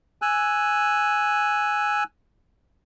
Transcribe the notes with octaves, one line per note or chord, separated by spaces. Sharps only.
G#5 E6 F#6